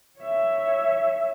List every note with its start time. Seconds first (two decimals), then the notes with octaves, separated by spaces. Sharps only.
0.19 C#5 E5